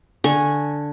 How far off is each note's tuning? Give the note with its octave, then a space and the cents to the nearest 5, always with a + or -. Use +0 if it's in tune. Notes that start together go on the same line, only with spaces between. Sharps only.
D3 +0 G#5 +0 C#6 -10